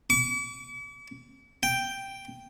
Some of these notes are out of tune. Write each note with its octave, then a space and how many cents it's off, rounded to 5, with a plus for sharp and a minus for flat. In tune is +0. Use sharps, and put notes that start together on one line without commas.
D6 -45
G5 +0